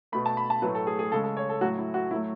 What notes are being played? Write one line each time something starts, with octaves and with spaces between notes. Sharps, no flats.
B2 A3 B5
A5
B5
A5
A2 F#3 A3 B4
A4
G#4
G#4
C#3 G#3 A4
A4
C#5
A4
A2 F#3 A3 F#4
E4
F#4
A2 F#3 A3 E4